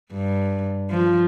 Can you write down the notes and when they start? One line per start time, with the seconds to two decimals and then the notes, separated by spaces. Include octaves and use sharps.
0.12 G2
0.90 F3